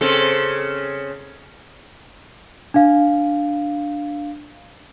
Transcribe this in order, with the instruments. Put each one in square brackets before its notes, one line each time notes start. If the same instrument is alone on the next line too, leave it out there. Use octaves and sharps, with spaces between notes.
[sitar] C#3 C4 A4
[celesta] D4 F5